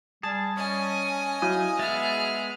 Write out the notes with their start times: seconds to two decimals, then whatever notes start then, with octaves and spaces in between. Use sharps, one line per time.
0.23 G3 G#4 A5 A6
0.57 C#4 D#5 G#5
1.42 F#3 E4 F5 D#6 G6
1.79 G#3 B3 G#4 E5 F6 A6